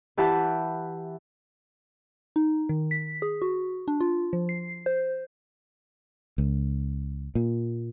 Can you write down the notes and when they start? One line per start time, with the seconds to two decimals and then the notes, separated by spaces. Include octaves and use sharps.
0.17 E3 E4 G4 F#5 A5 B5
2.36 D#4
2.69 D#3
2.91 B6
3.22 G#4
3.42 F#4
3.88 D4
4.01 F4
4.33 F3
4.49 C7
4.86 C5
6.38 C#2
7.35 A#2